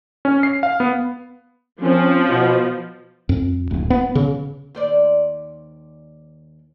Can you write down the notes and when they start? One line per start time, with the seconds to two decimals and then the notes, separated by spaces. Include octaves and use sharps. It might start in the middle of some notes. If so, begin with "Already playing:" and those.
0.25 C#4
0.43 C7
0.63 F5
0.80 B3
1.83 F3 C4 C#4
2.28 B2
3.29 F2
3.71 D1
3.90 B3
4.15 C#3
4.75 D#2 C5 D5